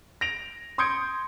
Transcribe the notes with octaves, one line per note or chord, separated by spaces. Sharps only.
A#6 D7 F7
C6 D#6 G6 G#6 C#7 D7